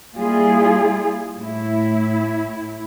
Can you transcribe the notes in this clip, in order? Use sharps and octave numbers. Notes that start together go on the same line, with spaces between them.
G3 A#3 E4 F4 G#4
A2 E4